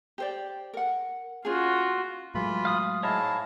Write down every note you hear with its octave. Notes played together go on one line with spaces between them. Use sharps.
G4 C5 D5
A#4 F#5
C#4 F4 F#4 G#4
A2 E3 F#3 G#3 F4 B5
F5 D#6
G#2 E4 G#4 C#5 D#5 F5 A5